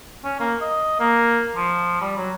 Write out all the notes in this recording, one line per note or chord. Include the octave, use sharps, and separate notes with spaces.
C#4
A#3
D#5
A#3
F3
G3
F#3